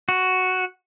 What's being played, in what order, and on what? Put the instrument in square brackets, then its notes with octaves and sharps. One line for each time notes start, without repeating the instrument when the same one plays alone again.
[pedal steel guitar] F#4